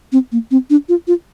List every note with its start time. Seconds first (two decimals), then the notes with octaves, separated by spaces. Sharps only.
0.12 C4
0.32 A#3
0.51 C4
0.70 D4
0.89 F4
1.07 F4